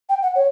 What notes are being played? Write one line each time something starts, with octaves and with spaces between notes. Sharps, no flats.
G5
F#5
C#5